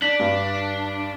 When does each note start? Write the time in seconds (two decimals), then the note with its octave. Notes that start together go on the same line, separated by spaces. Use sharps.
0.02 D4 B6 F#7
0.19 G2